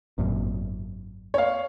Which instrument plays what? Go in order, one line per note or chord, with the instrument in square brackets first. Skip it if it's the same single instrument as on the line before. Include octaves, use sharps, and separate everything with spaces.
[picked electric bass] G#1 F#2 A#2
[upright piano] C#5 F5